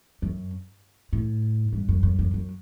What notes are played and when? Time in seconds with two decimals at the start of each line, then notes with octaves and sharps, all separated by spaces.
0.22 F#2
1.13 A2
1.73 G2
1.89 F#2
2.03 F#2
2.19 F#2
2.34 F#2